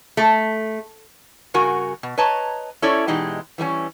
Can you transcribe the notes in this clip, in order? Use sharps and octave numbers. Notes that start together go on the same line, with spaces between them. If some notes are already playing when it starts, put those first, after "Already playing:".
A3
G2 C#3 F#4 A#4 G#5
B2
B4 C#5 D#5 A5 A#5
C#4 E4 A4 C#5 D5
B2 E3 G#3 D#4 G4
E3 G3 A3 C#4